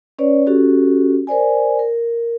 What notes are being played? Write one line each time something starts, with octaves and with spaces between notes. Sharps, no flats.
C#4 B4 C#5 D5
C#4 F#4 G4 A4
A#4 C5 D5 G#5
A#4